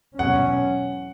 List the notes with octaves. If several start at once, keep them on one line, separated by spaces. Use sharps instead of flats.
E2 B2 F#3 C#4 F#5